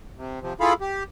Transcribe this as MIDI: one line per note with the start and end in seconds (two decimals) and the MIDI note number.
0.17 0.39 48
0.42 0.53 48
0.42 0.53 53
0.60 0.73 64
0.60 0.73 65
0.60 0.73 68
0.60 0.73 69
0.60 0.73 77
0.60 0.73 83
0.81 1.03 67